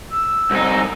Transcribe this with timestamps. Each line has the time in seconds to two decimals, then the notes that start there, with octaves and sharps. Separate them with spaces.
0.11 E6
0.51 C2 D#4